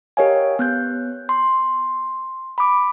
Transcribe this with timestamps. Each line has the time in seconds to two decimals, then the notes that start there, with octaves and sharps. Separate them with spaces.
0.17 G4 A#4 C#5 D#5 F5 G#5
0.59 B3 F#6 G6
1.29 C6
2.58 B5 D6